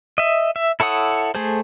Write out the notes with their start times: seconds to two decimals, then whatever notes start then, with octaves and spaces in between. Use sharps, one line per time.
0.18 D#5 E5
0.56 E5
0.80 E4 A4 C#5 F#5 D#6
1.35 A3 G#4 A4 C5